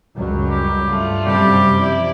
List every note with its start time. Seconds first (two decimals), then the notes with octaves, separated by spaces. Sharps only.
0.17 C#2 F#2 F#3 G3
0.50 G4
0.89 G2 A3 F4
1.24 F#2 C3 G3 G4
1.77 F3 E4 D5